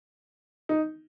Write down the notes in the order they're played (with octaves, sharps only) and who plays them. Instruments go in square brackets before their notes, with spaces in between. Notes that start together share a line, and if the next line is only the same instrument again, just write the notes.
[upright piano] D#4